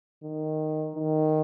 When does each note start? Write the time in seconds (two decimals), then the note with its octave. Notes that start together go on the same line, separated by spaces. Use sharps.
0.24 D#3
0.96 D#3